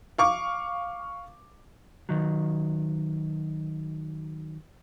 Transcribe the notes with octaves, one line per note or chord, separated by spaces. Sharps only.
F5 C#6 D6
D#3 F#3